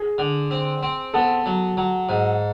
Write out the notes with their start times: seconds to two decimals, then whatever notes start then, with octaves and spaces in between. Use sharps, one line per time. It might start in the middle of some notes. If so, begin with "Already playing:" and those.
Already playing: G#4
0.18 D3
0.51 C4
0.83 C4
1.14 B3 A4
1.46 F#3
1.77 F#3
2.09 G#2